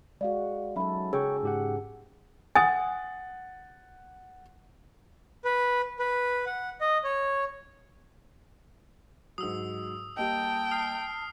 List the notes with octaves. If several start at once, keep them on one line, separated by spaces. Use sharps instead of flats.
G#3 F#4 D5 F5
F#3 C#4 D#4 A4 E5 B5
C#3 C#4 G#4 C#5 G5 C#6 E6
G#2 G4 F#5
F#5 G#5 D#6 A6
B4
B4
F#5
D#5
C#5
G#2 F#3 D#6 E6
G3 A#3 D#5 G5 A5
D#6 F6 C7